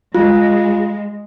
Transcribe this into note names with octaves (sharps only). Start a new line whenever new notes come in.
G#3 F4